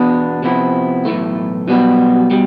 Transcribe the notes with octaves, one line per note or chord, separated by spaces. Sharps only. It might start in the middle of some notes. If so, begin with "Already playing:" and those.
Already playing: E2 B2 B3 D4
C3 F3 B3 E4
B1 A2 E3 A3
B1 B2 G3 B3
B2 G3